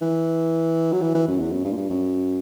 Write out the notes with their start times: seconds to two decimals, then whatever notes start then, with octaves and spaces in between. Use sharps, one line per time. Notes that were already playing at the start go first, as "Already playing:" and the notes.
0.02 E3
0.92 F#3
1.02 E3
1.14 E3
1.28 F#2
1.40 E2
1.52 F#2
1.64 G2
1.72 A#2
1.77 G2
1.90 F#2